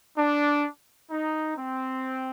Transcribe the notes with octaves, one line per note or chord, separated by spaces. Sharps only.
D4
D#4
C4